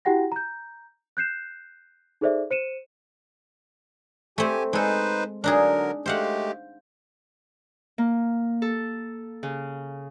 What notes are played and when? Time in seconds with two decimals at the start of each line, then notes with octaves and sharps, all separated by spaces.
0.05 E4 F#4 G4 F#5 G5 A#6
0.32 A#5 G6
1.17 F#6 G6 C7 E7
2.21 D#4 G#4 A4 C5 D5 E5
2.51 C5 C#7 D#7 E7
4.38 A3 C4 G4 G#5
4.73 G#3 D#4 A4 B4 C5
5.44 D3 F#3 D4 D#4 G#4 A#4
6.06 G#3 A3 G4 C5 F5 F#5
7.98 A#3
8.62 A4
9.43 C#3